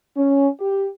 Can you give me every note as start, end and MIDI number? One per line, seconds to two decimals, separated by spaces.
0.17 0.48 61
0.60 0.88 67